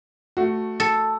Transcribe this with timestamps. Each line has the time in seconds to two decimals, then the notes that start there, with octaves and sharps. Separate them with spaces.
0.37 A3 F#4
0.80 A4